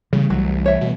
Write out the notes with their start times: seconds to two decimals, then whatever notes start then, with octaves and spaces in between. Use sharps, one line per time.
0.13 C#3 E3 G3 A3
0.30 C2 F#3
0.66 C#5 E5
0.81 B2